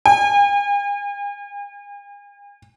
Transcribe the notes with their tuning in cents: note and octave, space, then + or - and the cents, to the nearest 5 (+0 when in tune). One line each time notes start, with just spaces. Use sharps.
G#5 -45